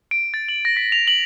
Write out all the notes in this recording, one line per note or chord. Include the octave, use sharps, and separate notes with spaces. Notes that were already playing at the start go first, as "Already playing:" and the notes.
D7
A6
F#7
A#6
B6
F7
F#7